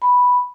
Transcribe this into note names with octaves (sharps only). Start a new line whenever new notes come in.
B5